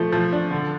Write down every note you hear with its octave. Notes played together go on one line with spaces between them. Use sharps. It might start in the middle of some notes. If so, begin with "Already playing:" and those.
Already playing: F3 A3
F3
D4
D3